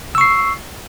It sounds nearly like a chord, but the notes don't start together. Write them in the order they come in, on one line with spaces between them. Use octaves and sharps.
E6 C#6 C7